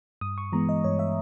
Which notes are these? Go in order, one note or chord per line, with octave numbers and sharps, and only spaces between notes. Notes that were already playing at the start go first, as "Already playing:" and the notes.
G2 D#6
C#6
E3 G#3 B3 A#5
D#5
G2 C#5
E5